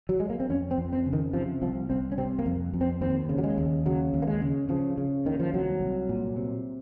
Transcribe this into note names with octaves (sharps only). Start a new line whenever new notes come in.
F#3
G#3
A#3
C4
F2 C#4
C4
F2
C4
C#3
D#3
C3 F3
C2 F3
C2 C4
C#4
C3 C4
A#3
F2
F2
C4
D#2 C4
C#3
F#3
G#3
D#2
C#3 F#3
D#2
A#3
G#3
C#3
C#3 F3
C#3
D#2 D#3
F3
C2 F#3
C2
A#2
C3